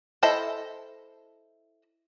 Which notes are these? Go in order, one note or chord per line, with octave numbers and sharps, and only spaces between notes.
E4 A4 C5 D#5 E5